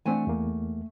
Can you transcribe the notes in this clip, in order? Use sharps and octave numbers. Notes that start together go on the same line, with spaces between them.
E3 A3 C4 D4 F#5 G#5
E2 A#3